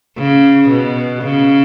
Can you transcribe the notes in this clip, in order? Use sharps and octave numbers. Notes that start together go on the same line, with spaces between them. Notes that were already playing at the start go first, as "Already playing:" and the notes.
C#3
B2
C#3